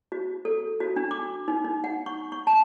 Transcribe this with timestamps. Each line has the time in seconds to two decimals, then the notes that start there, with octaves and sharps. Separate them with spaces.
0.12 F#4
0.45 A4
0.80 F#4
0.96 D4
1.11 D6
1.48 D#4
1.65 D#4
1.84 F#5
2.06 C#6
2.32 C#6
2.47 A5